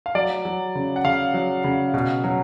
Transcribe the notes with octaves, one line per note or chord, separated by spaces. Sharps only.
F5
F#3 D5
F#3
C#3
F#5
C#3 F5
F#3
C#3
B2
F#3